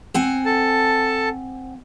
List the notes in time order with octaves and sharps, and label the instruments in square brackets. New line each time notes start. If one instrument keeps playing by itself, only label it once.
[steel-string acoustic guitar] C4 F#5 G#5
[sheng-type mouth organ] A4 A5